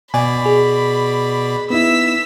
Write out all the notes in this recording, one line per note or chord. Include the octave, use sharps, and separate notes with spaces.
B2 D5 G#5 B5
G#4
B3 D#4 E4 E6 B6